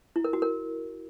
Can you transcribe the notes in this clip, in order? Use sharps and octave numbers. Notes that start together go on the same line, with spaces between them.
E4
A#4
F#4
A#4